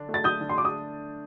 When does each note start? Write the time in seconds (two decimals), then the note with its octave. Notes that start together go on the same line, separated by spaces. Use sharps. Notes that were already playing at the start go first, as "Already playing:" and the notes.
Already playing: D3 D4
0.09 A3
0.14 A6
0.24 D3 D#6 G6
0.41 D3
0.49 C6
0.56 D4 D6
0.65 D#6